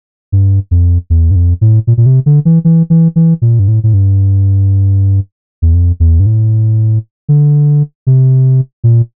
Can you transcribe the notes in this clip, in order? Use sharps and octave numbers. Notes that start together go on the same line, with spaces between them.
G2
F2
E2
G2
F2
A2
A#2
A#2
C3
D3
E3
E3
E3
E3
A#2
G2
A2
A2
G2
E2
F2
E2
G2
A2
D3
C3
A#2